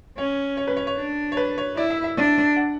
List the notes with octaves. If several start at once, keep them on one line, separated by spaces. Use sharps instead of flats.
C#4 C#5
C#5
B4
C#5
C#5
D4
C#5
B4
C#5
E4 D5
E5
E5
D4 D5
F#5